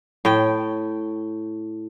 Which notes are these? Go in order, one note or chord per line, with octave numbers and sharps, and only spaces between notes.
A2 G5